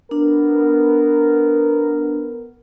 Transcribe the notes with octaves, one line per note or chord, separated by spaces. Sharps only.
B3 D4 A#4